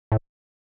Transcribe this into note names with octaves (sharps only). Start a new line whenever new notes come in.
A2